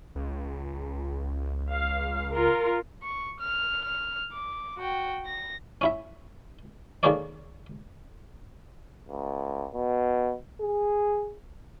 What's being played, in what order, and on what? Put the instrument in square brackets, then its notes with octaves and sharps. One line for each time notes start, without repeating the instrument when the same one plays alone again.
[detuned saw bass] C#2
[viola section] F5
F4 A#4
[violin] C#6
F6
F6
D6
F#4 G5
A#6
[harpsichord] C#4 E4 E5
D#3 A#3 G#4 A4 C#5 D5
[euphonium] C#2
B2
G#4